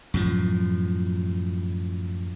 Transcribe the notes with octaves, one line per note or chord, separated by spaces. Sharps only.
F#2 A2 F3